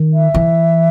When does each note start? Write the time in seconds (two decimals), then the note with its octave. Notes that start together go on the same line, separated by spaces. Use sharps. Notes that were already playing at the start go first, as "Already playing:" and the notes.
Already playing: D#3
0.13 E5
0.34 E3